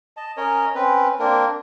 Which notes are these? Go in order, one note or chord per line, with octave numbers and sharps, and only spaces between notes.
D#5 A5
C#4 A#4 C#5 D#5
C4 C#4 B4
A#3 C4 D4 A#4